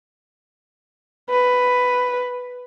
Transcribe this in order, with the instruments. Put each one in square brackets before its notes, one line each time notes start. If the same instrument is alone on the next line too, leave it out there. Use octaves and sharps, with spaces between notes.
[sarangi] B4